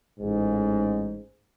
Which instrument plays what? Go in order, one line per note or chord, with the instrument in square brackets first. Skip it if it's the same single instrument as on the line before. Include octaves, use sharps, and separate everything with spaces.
[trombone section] A1 G#2